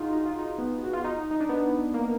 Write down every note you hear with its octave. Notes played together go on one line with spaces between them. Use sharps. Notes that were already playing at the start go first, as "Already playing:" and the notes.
Already playing: D#4 F4 F#4 G#4
D#4
F4
D#4
B3
F#4
F4
D#4
D#4
D4
B3
A#3